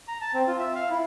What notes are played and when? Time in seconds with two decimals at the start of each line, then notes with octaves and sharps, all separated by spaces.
0.08 A#5
0.21 A5
0.34 C4
0.47 F4
0.59 E5
0.75 F5
0.90 E4